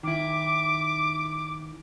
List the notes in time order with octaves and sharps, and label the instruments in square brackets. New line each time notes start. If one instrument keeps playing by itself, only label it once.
[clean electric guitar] D#3 E4 [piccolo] D6